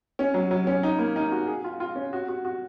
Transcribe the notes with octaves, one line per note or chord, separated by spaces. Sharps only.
C#4
F#3
F#3
C#4
D#4
A#3
D#4
F#4
G#4
F4
F4
C#4
F#4
F#4
F#4